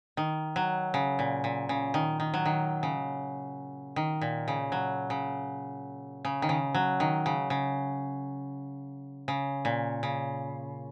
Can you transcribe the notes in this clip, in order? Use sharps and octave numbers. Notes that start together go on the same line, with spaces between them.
D#3
F#3
C#3
A#2
A#2
C#3
D#3
D#3
F#3
D#3
C#3
D#3
A#2
C#3
F#3
C#3
C#3
D#3
C#3
F#3
D#3
C#3
C#3
C#3
A#2
C#3